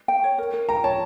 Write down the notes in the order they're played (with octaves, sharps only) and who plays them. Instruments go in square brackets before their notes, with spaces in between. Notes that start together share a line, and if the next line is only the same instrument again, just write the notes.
[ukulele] G5
C#5
A#4
A#4
[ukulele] G5 [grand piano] A#5
[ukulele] C#5 [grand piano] A5